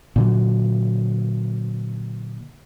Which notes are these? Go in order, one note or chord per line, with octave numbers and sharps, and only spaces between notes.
A#2 D3 F#3